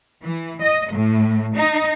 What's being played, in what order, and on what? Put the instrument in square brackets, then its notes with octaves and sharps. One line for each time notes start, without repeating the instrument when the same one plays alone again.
[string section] E3
D#5
A2
D#4